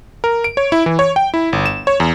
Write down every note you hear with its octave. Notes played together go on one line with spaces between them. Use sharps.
A#4
D7
C#5
E4
E3
C#5
G5
E4
G1
E7
C#5
E2